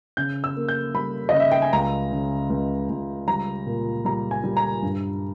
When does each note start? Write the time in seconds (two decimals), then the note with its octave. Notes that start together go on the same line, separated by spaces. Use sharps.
0.17 C#3 G6
0.44 E6
0.56 A#3
0.69 G6
0.94 G3 B5
1.29 C#3 D#5
1.40 E5
1.51 G5
1.62 G#5
1.73 C#2 A#5
2.12 C#3
2.50 C#2
2.90 C#2
3.28 G3 A#5
3.66 A#2
4.05 G3 A#5
4.31 G#5
4.44 G3
4.57 A#5
4.83 G2